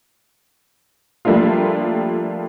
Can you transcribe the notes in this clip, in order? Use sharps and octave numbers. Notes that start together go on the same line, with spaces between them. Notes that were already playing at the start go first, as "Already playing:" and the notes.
F3 G3 A3 A#3 D4 F4